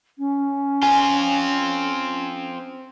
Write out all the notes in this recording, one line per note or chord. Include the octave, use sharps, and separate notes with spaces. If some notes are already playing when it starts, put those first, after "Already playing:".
C#4
C4 F4 G#5